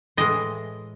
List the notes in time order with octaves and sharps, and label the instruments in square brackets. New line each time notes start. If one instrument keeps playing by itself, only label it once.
[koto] A2 E3 G#3 D#5